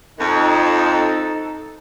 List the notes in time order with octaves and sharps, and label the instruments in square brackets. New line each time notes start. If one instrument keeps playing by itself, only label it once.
[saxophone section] F2 [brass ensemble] D#4 A4